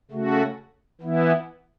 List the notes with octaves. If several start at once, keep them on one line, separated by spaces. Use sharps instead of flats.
C#3 A3 F#4
E3 B3 E4